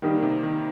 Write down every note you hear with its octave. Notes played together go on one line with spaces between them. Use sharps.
D#3 G3 A#3 D#4 G4
C3
D#3